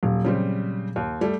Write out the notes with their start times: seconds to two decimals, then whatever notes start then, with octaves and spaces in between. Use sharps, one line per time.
0.03 D#1 A#2 F#3
0.24 C#3 G3 C4
0.96 D#2
1.21 G3 A3